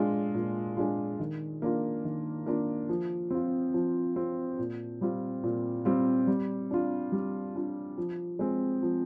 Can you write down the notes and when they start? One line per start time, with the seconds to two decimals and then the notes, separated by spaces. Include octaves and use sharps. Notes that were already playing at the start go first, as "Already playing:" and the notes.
Already playing: A#2 G#3 D4 F4
0.34 A#2
0.77 G#3 D4 F4
1.20 D#3
1.62 A#3 D4 F4
2.05 D#3
2.46 A#3 D4 F4
2.89 F3
3.31 C4 F4
3.74 F3
4.16 C4 F4
4.59 A#2
5.01 G3 C4 F4
5.43 A#2
5.85 G3 C4 F4
6.27 G3
6.71 D4 F4
7.12 G3
7.55 D4 F4
7.98 F3
8.39 G#3 C4
8.83 F3